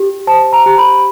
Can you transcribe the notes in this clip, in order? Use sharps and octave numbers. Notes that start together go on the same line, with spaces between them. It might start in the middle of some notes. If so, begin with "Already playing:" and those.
Already playing: G4
C5 A5
A#5
G4
B5